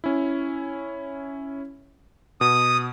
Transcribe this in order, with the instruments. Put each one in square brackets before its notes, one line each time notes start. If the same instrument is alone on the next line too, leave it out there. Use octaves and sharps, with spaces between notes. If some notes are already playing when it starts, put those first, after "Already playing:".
[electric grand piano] C#4 E4
[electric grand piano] B2 [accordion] D#6